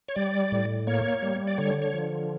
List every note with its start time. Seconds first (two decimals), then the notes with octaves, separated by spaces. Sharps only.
0.08 C#5
0.16 G3 D5
0.52 A2
0.87 A#3 C#5
1.22 G3
1.47 D5
1.58 D3 C#5
1.82 C#5
1.93 F3